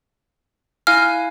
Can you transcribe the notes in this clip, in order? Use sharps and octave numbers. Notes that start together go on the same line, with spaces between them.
E4 F5 G#5 F6